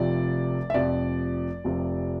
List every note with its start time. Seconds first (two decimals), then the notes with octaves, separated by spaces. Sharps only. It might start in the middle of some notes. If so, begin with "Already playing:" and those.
Already playing: F1 F2 C3 F3 D5
0.70 E5
0.74 F1 F2 C3 F3 D5
1.64 F1 F2 C3 F3